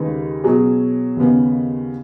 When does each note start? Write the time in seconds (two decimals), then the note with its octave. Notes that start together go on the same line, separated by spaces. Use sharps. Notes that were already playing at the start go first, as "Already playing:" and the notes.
Already playing: D#2 C#3 G#3 D#4 B4
0.44 B2 F#3 C#4 G#4
1.17 D#2 C#3 B3